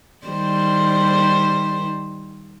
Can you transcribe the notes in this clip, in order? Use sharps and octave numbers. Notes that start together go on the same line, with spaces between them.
D#3 G3 C5